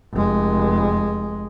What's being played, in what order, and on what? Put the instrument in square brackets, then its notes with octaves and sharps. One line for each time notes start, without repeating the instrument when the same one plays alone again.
[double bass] F1 G#3